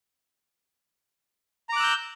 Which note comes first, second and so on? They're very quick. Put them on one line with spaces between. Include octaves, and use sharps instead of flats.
A#5 D6 F#6 E6 G6